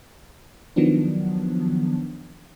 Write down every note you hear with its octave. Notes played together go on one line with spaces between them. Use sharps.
D#3 F3 F#3 B3 D4